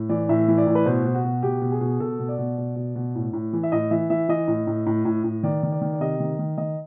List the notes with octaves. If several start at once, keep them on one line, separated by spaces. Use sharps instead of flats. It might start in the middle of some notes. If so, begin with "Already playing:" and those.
Already playing: A2
E3 D5
A2 E5
E3
D5
A2
B4
B2 C5
B2
F#4
B2
B2 G4
B2
G#4
B2
B2 A4
B2
D5
B2
B2
B2
B2
A2
A2
E3
E5
A2 D#5
E3 E5
E3 E5
E3 D#5
A2
A2
A2
A2
A2
D#3 D5
D#3
D5
D#3
D5
C3 D#5
D#3
D#3
D#3 D#5